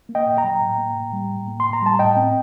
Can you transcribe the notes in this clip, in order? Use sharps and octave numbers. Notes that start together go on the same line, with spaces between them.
A#3
D#5 G5
A#2
G5 A#5
F#3
A2
A#3
A2
G3
A2
A#3
A2 C6
A#5
G3 A5
A2 D#5 G5
C4